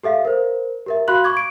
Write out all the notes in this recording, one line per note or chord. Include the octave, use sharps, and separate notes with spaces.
G4 A4 E5 F5
A#4 C5
G4 A#4 E5
F#4 F5 B5 C6 F#6 F#7
C#6 D6 G#6
D7